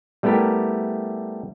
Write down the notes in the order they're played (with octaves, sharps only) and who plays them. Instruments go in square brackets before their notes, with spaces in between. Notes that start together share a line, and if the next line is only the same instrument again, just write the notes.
[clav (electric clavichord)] G3 A3 B3 E4 G4 A#4